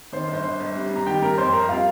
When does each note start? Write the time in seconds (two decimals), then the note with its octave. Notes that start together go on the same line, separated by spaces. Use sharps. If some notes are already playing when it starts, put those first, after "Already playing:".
0.13 D#3 C5
0.29 G1
0.34 C5
0.44 G1
0.60 G1
0.75 G3
0.91 G3 A#5
1.06 D#3 G4 G5
1.22 G3 A#4 A#5
1.38 F2 C5 C6
1.53 F2 A#4 A#5
1.69 G3 F4 F5